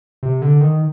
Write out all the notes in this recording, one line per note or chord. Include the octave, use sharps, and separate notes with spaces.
C3
D3
D#3